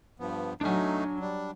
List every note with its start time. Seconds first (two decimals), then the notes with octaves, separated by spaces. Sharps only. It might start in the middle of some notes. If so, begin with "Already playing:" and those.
0.19 G2 F3 B3
0.61 F#3 A3 D4 D#4 G#5
1.20 G3 D4